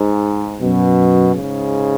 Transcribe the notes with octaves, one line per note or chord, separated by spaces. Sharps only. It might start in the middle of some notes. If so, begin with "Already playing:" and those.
Already playing: G#2
F#2 B2
G#2 C#3